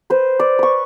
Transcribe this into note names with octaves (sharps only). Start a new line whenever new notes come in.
B4 C5
D5
B4 C#6